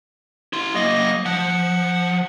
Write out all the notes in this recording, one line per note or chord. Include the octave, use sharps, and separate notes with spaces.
E4 C6
F#3 A#3 D#5
F3 F#5